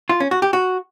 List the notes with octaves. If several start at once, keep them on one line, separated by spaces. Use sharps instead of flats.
F4
C#4
F#4
G4
F#4